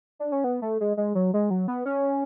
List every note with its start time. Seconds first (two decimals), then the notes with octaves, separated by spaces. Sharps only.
0.19 D4
0.32 C#4
0.44 B3
0.62 A3
0.80 G#3
0.97 G#3
1.15 F#3
1.34 G#3
1.50 F#3
1.68 B3
1.85 C#4